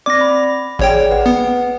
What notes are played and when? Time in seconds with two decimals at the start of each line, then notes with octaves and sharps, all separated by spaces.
0.06 C4 D5 D6 A#6
0.21 B5
0.79 A1 G#4 C#5 D5 G5
1.11 B4 F#5
1.26 B3